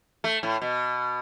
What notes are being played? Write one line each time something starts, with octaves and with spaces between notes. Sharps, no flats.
A3
A2
B2